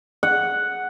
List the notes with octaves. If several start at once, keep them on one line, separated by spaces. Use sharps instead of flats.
F#5